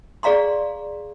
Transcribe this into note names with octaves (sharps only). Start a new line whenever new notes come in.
G#4 D5 F5 A#5 C6